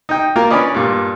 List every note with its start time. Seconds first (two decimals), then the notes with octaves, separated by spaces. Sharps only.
0.09 D#4 G5
0.36 A#3 F4 A#4
0.51 C#4 D4 B4 D5 D#5
0.74 G2 A#2